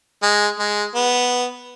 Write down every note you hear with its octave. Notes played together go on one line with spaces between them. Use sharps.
G#3
G#3
B3